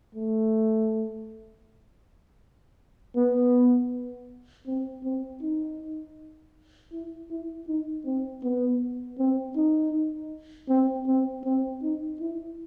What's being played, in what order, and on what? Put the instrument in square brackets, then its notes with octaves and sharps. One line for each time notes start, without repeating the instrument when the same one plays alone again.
[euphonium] A3
B3
C4
C4
D#4
E4
E4
D#4
C4
B3
C4
D#4
C4
C4
C4
D#4
E4